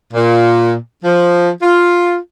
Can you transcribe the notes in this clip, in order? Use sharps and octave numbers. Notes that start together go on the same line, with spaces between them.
A#2
F3
F4